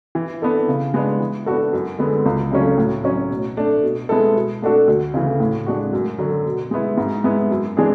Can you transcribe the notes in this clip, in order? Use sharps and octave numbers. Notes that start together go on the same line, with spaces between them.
E3
B3 D4 A4
C#3
G#3 B3 D4
E3
B3 D4 F#4 A4
F#2
D3 G#3 B3
C#2
C#3 F#3 A3 C#4
A2
F#3 C#4
B2
A3 D4
B2
G#3 B3 E4 A4
B2
A3 D4 F#4 A4
D2
C#3 E3 A3
A2
G#3 D4 F#4
F#2
D3 F#3
B2
G#3 B3 E4
G#2
G#3 B3 E4
F#2
E3 G#3 D4 G#4